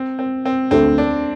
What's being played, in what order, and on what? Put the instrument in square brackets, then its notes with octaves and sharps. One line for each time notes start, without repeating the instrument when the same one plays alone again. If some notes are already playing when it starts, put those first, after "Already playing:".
Already playing: [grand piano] C4
C4
C4
[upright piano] D2 D3 A3 [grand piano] C4
[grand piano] D4